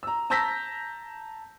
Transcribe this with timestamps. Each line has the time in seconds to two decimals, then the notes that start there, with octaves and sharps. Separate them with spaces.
0.03 A#5 E6
0.30 A5 A#5 E6 G6 A#6 B6